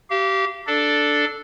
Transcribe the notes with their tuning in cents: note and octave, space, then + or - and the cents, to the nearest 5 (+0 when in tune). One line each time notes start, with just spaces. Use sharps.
G4 -25 F5 -30
D4 +0 A4 +0 D5 +0